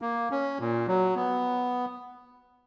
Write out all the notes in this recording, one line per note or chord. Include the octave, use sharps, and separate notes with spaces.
A#3
C#4
A#2
F#3
B3